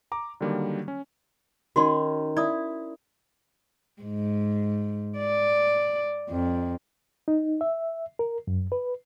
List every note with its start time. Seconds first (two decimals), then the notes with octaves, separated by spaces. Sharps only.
0.12 A#5 D6
0.41 D3 D#3 F#3 G3 A#3
0.88 C#4
1.76 D#3 C#4 F#4 C6
2.37 E4 D5 D#6
4.02 G#2
5.19 D5
6.30 F2
7.28 D#4
7.61 E5
8.19 A#4
8.47 F#2
8.72 B4